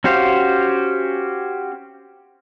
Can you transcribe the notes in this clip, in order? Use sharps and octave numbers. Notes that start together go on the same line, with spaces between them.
C#4 F#4 G4 C5 F5